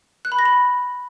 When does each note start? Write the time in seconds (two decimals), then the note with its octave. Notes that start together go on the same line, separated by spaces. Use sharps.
0.25 F#6
0.32 B5
0.39 A#6
0.45 B5